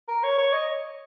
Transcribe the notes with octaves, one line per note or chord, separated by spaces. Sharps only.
A#4
C#5
C#5
D#5